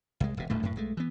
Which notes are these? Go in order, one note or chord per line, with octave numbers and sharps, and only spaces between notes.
C2 G#3
E1 B2
D1 D2 A2 A3
F#2 A2
B1 G#3 A3
E3 B3